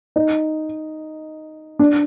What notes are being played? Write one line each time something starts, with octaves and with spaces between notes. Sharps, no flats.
D#4
D4